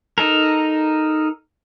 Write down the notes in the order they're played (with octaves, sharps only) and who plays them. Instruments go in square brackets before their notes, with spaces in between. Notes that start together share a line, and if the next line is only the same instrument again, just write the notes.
[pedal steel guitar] D#4 A4 A#4